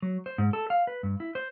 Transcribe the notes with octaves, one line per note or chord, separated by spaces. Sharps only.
F#3
C5
G#2
A4
F5
B4
G2
E4
C5